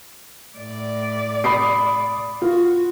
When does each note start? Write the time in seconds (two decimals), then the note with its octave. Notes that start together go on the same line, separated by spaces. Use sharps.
0.57 A2 D5
1.44 B5 D#6 C7
2.42 F4 F#4